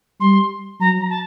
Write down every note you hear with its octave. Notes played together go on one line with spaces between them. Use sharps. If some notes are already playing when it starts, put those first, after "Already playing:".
G3 C6
F#3 A#5
A#5
A5